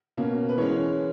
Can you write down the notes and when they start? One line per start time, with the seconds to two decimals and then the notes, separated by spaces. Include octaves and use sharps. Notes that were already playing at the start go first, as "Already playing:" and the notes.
0.17 B2 A#3 C#4
0.49 B4
0.57 E3 G#3 C#4 C#5